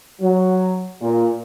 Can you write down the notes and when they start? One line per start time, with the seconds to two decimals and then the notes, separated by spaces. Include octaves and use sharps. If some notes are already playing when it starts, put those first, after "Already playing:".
0.21 F#3
1.02 A#2